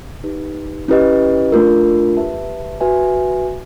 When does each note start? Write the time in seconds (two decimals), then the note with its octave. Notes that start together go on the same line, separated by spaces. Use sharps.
0.24 D#4 G4 B4
0.88 C#4 E4 G4 B4 D#5
1.52 A3 D4 F4 A#4
2.17 G4 B4 E5 A5
2.81 F#4 B4 E5 G#5